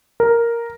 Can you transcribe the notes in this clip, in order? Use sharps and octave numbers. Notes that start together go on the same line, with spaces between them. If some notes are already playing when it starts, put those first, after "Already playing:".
A#4